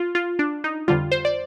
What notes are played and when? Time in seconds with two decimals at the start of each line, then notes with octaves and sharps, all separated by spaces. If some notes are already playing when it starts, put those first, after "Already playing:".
Already playing: F4
0.15 F4
0.39 D4
0.64 D#4
0.88 F2 D3 G3 F4
1.12 C5
1.25 D5